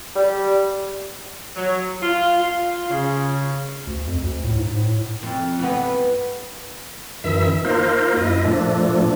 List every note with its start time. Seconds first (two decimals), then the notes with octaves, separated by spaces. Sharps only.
0.16 G3
1.56 F#3
2.02 F4
2.38 F4
2.90 C#3
3.87 D2
4.08 F2
4.22 D2
4.44 A2
4.57 G#2
4.75 A2
5.23 F2
5.59 G2 E3 B3
7.24 F#2 D#3 E3 E5 E6
7.65 A#3 D#4 F4 A#4 C5
8.16 F#2 E4 D#5
8.44 A#2 F3 A3 D4